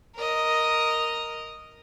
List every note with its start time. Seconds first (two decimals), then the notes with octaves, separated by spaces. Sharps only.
0.15 A#4 D#5